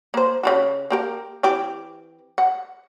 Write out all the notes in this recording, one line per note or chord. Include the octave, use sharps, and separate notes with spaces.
A#3 C5
C#3 F4 F#4
A#3 G4 A#4
E3 C4 G4
F#5